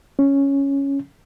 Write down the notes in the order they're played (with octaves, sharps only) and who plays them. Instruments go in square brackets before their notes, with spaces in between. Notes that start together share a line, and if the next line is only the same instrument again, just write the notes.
[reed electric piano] C#4